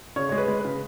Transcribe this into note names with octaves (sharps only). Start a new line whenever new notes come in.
C#3 C#5
G#3 C#5
B4
G#3
B4
C#3